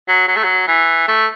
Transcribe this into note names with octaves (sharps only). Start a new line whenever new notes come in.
F#3
F#3
A3
F#3
E3
A3